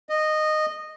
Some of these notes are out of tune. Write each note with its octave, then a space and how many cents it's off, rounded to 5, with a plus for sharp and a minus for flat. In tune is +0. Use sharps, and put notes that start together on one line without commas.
D#5 -15